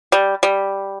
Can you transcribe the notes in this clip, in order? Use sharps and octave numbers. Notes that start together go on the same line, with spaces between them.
G3
G3